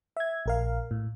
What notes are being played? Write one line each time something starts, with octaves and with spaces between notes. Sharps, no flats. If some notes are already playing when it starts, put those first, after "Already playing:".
E5 G#6
A#1 A#4 F5
A2